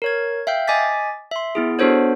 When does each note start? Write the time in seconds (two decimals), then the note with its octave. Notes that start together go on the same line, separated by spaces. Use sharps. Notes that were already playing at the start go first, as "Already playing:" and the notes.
0.02 A#4 C#5 G#6
0.47 E5 F5 G5 G6
0.68 D#5 G#5 D6 A6 B6
1.31 E5 C6
1.55 B3 E4 G#4
1.79 B3 D4 F#4 A4 C5 C#5